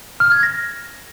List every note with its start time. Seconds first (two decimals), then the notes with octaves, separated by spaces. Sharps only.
0.20 F6
0.32 G#6
0.43 A#6